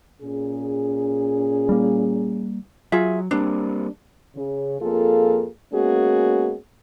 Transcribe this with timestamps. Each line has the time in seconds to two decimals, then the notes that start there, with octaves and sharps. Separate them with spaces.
0.22 A#2 C#4 G#4
1.69 G3 A#3
2.92 F#3 F4 G#4 E5
3.31 G3 A#3 C4 D4
4.36 C#3
4.80 F2 A#3 F4 G#4 A4
5.73 G#3 A#3 B3 C#4 F#4 G#4